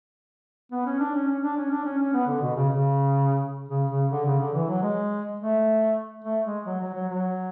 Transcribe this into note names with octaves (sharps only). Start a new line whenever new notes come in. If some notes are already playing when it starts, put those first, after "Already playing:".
B3
C#4
D4
C#4
C#4
D4
C#4
D4
C#4
C#4
B3
D3
B2
C#3
C#3
C#3
C#3
D3
C#3
D3
E3
F#3
G#3
A3
A3
G#3
F#3
F#3
F#3
F#3